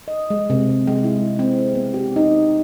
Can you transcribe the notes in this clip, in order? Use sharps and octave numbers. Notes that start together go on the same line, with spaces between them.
D#5
G#3
C3
G#3
E4
C4
B3
G4
D#4